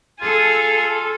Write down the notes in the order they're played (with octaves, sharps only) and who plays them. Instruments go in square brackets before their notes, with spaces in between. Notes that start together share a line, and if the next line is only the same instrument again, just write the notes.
[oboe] F4 [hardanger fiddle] G#4 [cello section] A4